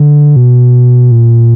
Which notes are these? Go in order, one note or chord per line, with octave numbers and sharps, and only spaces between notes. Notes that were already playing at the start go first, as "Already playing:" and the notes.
Already playing: D3
B2
A#2